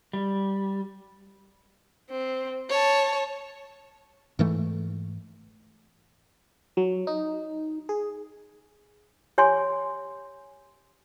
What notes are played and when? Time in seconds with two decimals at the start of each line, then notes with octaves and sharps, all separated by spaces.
0.13 G3
2.10 C4
2.70 C#5 A5
4.39 G#2 E3 A3
6.77 F#3
7.07 D#4
7.89 G#4
9.38 G4 C#5 G#5 C6